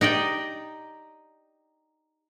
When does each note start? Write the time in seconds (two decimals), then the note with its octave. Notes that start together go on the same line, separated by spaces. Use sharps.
0.01 D#4 G4 D5 G5